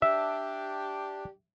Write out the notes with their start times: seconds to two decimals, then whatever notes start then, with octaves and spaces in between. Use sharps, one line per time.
0.02 D4 G4 E5